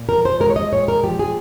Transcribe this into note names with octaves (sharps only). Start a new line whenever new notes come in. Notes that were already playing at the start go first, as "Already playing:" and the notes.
Already playing: A#2
F3 A#4
C5
G#3 A#4
C#5
D#5
A#2 C#5
A#4
F3 G4
G#4